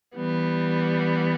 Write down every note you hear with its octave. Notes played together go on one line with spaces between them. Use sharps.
E3 G3 B3